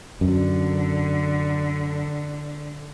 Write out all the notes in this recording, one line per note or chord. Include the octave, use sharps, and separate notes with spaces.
F#2 D3